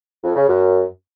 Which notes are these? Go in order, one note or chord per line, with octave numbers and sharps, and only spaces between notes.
F2
C#3
F#2